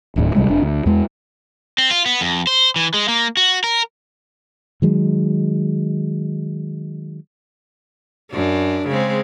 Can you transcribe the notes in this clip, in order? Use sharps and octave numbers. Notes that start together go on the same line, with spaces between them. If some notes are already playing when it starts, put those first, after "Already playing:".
D1 D#2 A2
C#2 C3 G3 G#3
F1 D4
D2
E2 G#3
C4
F4
B3
F2
C5
E3
G#3
A#3
F#4
A#4
D#3 F#3 G#3
F#2 D4
C#3 G#3 C4